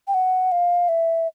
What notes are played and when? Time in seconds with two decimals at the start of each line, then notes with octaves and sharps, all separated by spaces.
0.08 G5
0.14 F#5
0.52 F5
0.89 E5